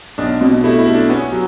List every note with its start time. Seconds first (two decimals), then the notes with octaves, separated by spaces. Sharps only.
0.18 B1 D4
0.41 B2
0.64 A3 E4
0.79 E4
0.86 A3
0.95 D4
1.09 B3 C#4
1.32 F#3